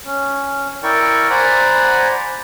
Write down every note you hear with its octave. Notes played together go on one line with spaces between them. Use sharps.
C#4
E4 A#4 D5 G5 C#6
C5 D5 F#5 G#5 A#5 B5